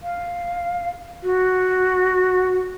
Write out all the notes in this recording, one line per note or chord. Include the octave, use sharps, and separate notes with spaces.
F5
F#4